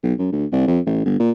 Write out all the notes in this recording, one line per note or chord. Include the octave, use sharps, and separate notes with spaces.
B1
F#2
D2
C2
F2
A1
G1
A#2